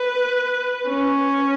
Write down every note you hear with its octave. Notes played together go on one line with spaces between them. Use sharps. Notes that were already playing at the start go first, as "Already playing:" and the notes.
Already playing: B4
C#4